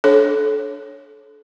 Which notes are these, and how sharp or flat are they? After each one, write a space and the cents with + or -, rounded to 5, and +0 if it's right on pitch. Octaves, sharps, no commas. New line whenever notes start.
D4 +0 A4 -30 C#5 -20